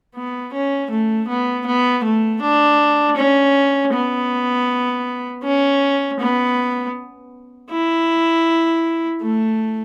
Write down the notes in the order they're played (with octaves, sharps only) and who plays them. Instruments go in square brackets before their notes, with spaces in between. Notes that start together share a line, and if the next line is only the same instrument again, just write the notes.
[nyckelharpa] B3
C#4
A3
B3
B3
A3
D4
C#4
B3
C#4
B3
E4
A3